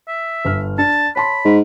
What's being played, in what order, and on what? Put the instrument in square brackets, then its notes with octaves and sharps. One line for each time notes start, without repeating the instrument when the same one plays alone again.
[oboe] E5
[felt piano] G1 F6
[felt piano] D4 [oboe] A5
[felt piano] C#5 A5 C6 [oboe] B5
[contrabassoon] G#2